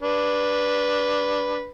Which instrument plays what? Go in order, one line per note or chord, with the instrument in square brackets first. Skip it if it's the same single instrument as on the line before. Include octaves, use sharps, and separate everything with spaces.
[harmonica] D4 B4